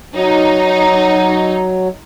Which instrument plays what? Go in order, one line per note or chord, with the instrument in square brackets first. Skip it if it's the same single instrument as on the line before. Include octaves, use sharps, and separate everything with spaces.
[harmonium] F#3 [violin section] D#4